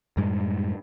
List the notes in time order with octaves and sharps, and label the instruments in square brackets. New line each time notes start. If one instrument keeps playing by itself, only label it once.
[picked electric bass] F#2 A2 G3 G#3